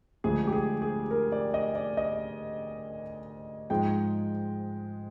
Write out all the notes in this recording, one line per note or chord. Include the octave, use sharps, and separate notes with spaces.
D2 D3 F3 G#3 G#4
G4
G#4
G#4
A#4
D5
D#5
D5
D#5
G#2 F3 G#3 G5